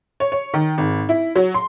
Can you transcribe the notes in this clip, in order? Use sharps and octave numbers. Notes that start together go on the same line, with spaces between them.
C#5
C#5
D#3
G#1
E4
F#3
C6